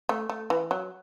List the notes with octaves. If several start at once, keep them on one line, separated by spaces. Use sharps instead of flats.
A3
A3
E3
F#3